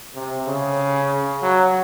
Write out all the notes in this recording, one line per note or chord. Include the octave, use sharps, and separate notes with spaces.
C3
C#3
F#3